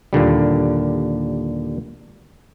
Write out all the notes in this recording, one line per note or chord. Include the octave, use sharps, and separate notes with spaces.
D#2 A#2 D3 G3